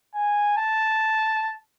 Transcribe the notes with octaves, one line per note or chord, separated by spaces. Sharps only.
G#5
A5